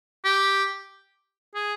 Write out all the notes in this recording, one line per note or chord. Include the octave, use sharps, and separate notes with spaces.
G4
G#4